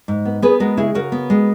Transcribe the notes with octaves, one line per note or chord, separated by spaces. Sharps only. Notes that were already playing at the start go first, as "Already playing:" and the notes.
G#2
B3
B3 G#4 B4
G#3 F#4 A#4
C#3 E4 G#4
C#3 F#4 A#4
B3
G#3